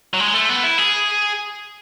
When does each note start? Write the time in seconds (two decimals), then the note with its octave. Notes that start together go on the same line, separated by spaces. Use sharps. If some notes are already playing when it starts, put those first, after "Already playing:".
0.14 F#3
0.20 G#3
0.34 A3
0.49 B3
0.63 E4
0.78 G#4